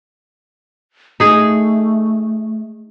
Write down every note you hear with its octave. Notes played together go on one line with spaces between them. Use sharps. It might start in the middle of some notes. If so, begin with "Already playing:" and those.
A3 D#4 G#4